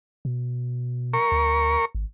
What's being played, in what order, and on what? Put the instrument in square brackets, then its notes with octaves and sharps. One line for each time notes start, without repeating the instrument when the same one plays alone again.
[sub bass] B2
[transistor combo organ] A#4 C#6
[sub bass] D2
G#1